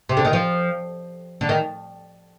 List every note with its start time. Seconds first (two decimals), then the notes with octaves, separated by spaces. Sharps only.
0.09 C3
0.17 D3
0.25 D#3
0.33 F3
1.41 D3
1.49 D#3